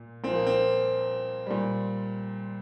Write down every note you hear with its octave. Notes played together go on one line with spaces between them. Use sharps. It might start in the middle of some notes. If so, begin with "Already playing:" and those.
Already playing: A#2
A#2 F3 C4
A#3
C4
A#2 G3